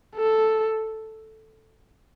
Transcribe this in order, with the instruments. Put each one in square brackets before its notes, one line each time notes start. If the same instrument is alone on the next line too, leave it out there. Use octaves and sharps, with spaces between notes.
[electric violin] A4